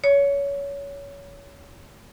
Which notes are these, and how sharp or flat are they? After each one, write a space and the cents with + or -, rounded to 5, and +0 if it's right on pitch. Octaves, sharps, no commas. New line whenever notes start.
C#5 +25